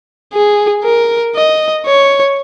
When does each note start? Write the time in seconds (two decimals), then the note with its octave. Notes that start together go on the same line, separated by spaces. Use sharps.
0.33 G#4
0.84 A#4
1.35 D#5
1.86 C#5